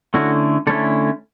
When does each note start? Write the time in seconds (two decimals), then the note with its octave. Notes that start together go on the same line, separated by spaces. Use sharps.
0.14 D3 A3 C#4 E4 F#4
0.67 D3 A3 C#4 E4 A4